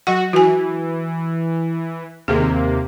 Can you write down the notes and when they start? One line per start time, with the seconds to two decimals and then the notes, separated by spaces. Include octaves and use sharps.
0.07 F#3 F#4 F#5
0.33 E3 F#4 G#5
2.28 D#2 C3 A#3 G#4